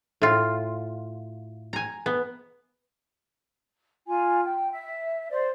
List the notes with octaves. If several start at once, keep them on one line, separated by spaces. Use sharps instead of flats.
A2 F4
G#5 A#5
B3
F4 G#5
G5
E5
C5 D5